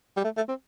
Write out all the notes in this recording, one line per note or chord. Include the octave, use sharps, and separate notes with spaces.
G3
A3
A3
C4